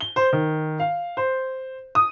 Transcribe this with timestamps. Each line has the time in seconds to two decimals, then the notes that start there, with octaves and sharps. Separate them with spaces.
0.01 G7
0.16 C5
0.33 D#3
0.80 F5
1.17 C5
1.95 D#6